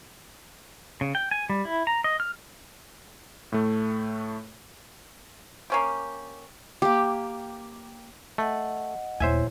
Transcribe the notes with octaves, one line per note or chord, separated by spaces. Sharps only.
C#3
G5
G#5
G3
E4
A#5
D#5
F6
A2 A3
A#3 C#4 G4
A#3 G4
A3 D#5 F#5
D#1 B3 E4 C5 C#5 E5 G#5